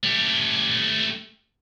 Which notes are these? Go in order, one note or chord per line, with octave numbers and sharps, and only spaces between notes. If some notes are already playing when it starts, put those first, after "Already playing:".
A3 G4